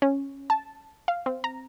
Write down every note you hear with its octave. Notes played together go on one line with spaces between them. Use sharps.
C#4
A5
F5
C4
A#5